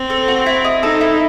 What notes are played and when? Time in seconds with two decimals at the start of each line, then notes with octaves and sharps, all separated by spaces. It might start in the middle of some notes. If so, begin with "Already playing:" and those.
Already playing: C4
0.10 A4
0.28 F#4
0.46 E4
0.65 D#5
0.83 D#4 A4
1.01 E4